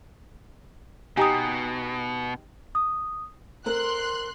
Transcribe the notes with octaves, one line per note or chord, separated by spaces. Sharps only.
B2 D#4 G4 G#5 A#5 D#6
D#6
C4 A#4 C6 F#6